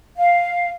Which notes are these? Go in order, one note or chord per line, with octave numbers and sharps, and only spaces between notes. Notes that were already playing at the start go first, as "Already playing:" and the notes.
F5